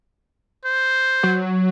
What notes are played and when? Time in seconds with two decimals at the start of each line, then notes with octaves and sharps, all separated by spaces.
0.65 C5
1.23 F#3